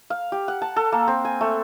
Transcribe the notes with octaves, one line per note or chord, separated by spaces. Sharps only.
F5
G4
F#5
A5
A4
A#3
C4
G#5
A3